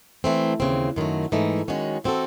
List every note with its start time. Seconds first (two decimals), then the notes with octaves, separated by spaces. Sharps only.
0.24 E3 A3 C4
0.60 D#2 C#3 E3 C4
0.96 F#2 D#3 F#3 A3
1.32 G#2 E3 A3 D#4
1.68 F#2 D#3 G#3 C#4 F#4
2.04 E3 C4 F#4 A4